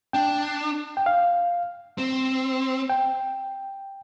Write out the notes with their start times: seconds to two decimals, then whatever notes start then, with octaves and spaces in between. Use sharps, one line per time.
0.13 D4 G5
0.97 G5
1.06 F5
1.98 C4
2.90 G5